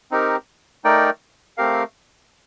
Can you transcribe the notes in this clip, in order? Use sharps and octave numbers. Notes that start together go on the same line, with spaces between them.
C4 D#4 G4 A#4
A3 D#4 A#4 D5 G5
A3 C4 G4 A#4 F5